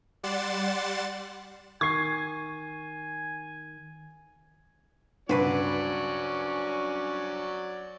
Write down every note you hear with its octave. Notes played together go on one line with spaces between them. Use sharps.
G3 D5 F#5 C6 A6 E7
D#3 G#5 C#6 G#6 C7
C#2 G2 F#3 C#4 F#4 B4 C5 D5